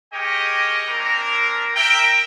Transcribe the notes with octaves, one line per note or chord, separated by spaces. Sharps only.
G4 G#4 A#4 C#5 D#5 G5
A#3 C4 D4 A#4
A#4 E5 G5